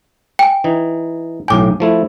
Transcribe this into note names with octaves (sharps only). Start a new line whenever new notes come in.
G5 G#5
E3 D#4
B1 A2 G5 G#5 D6
F3 A3 E4